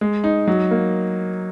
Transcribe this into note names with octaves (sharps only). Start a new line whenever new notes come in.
G#3
D#4
F#3
A#3